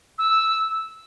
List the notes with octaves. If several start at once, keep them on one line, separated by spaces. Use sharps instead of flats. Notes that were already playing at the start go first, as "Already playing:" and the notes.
E6